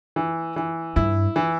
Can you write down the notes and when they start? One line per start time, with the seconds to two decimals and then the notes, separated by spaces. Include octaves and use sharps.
0.16 E3
0.56 E3
0.96 G2 E4
1.36 E3